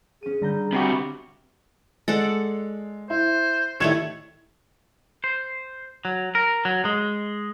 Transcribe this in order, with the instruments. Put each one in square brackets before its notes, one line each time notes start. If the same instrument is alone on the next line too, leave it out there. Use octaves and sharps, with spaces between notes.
[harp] C#4 D#7 [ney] G#4
[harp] D3 A#5 G6 [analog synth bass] G3
[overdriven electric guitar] C3 F#4 [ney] G4 [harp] G5 B5 D6
[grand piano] G#3 [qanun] A4 D5 F#5
[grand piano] E4 [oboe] C5
[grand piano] A2 G#6 E7 [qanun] D#3 G3 A3 [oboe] C#5
[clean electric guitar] C5
F#3
A#4
F#3
G#3